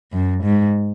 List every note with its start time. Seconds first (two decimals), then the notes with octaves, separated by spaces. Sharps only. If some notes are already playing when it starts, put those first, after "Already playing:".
0.12 F#2
0.43 G#2